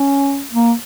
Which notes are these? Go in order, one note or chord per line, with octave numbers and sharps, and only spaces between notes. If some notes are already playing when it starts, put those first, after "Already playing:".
Already playing: C#4
A#3